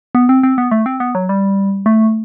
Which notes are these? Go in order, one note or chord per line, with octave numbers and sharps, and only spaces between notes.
B3
C4
C4
B3
A3
C4
B3
F#3
G3
A3